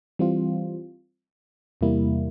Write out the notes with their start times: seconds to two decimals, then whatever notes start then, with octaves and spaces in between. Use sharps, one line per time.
0.19 E3 G3 C4 F4
1.81 E2 C3 G3 A#3 E4